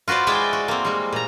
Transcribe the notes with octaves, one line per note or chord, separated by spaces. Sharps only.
F4 F#4 B4 C5 D5
G#3 E4 D5 E5 G5 G#5
F#4
A#3 C4
G3 G#3
A#2 A#5